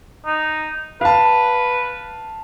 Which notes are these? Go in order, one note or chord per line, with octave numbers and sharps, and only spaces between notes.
D#4
B4 F5 A5